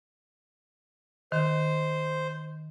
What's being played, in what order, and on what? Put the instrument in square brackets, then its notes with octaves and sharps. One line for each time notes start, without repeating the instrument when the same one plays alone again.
[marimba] D#3 [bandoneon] C5